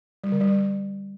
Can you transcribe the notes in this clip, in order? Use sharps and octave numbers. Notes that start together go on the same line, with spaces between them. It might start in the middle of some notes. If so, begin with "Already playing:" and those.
G3
D3
G3